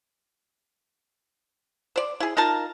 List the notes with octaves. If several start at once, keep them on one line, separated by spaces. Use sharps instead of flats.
C5 D5
E4 G#4
D#4 F4 A#4 A5